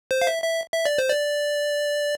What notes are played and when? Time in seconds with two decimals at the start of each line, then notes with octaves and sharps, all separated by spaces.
0.11 C5
0.22 F5
0.27 E5
0.43 E5
0.73 E5
0.85 D5
0.98 C5
1.10 D5